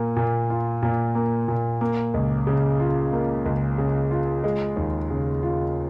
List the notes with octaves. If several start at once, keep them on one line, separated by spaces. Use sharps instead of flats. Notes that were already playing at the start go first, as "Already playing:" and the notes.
Already playing: A#2 A#3
A#2
F4
A#2
A#3
A#2
A#3
C#2
C#3
F4
A#3
C#2
C#3
F4
G#3
D#2
C#3
F4